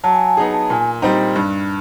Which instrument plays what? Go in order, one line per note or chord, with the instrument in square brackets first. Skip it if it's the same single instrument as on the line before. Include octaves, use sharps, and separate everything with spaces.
[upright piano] F#3 [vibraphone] A5
[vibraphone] G#5
A5
[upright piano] B3 D#4 G#4 [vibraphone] A#5
[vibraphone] A5
[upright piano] A#2 [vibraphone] G#5
[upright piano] G3 C4 D#4 [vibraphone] G5
[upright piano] G2